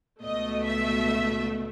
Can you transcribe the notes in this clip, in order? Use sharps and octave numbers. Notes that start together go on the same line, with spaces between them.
C#2 B2 A3 D#5
E5